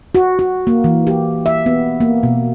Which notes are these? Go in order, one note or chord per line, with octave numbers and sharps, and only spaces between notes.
F#4
F#4
A#3
E3
G4
E5
B3
A#3
B2